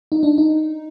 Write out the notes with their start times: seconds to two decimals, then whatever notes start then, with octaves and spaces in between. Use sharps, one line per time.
0.12 D#4
0.23 D4
0.38 D#4